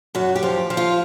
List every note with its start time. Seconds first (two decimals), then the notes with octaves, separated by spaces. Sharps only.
0.15 F#2 F#4
0.36 G4
0.43 F3
0.70 F3
0.77 F4